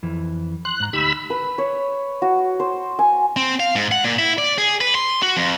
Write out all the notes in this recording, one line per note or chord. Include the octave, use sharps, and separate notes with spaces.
F2 E3
C6 F#6
G#2 A#5
D2 D#4 G4 B5 E6
B4
C#5
F#4
C5
G#5
C4
F5
G#2
F#5
A#2
E4
D5
G#4
B4
C6
F#4
F2